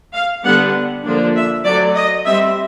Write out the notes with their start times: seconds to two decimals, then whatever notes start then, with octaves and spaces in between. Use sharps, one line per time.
0.13 F5
0.44 D3 G3 B3 D4 F#5
1.04 D3 F3 A#3 D4
1.35 E5
1.64 F#3 A3 C4 D5
1.96 D#5
2.25 G3 C4 E5